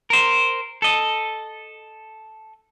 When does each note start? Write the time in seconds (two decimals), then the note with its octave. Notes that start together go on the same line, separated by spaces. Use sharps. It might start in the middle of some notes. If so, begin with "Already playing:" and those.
0.10 A#4 C5
0.82 A4 D#5